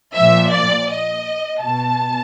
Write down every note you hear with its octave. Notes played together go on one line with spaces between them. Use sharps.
A#2 F3 E5
D5
D#5
B2 A5